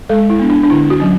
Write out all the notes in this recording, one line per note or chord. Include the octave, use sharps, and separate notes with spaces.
G#3 A4
E4
B3 D4
D4
D4
D3 E4
F#4
F#3 C#4